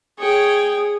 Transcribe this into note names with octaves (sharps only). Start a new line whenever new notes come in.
G#4 C#5 G5